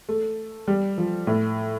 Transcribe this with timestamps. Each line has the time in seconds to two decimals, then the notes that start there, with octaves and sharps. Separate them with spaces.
0.09 A3
0.68 G3
0.98 F3
1.27 A2